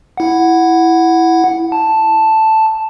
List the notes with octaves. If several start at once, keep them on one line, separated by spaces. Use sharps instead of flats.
E4 F#5
A5